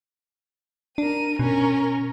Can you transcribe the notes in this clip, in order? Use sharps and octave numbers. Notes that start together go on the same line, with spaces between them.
D4 A#4 D#7
B2 C#4 A#4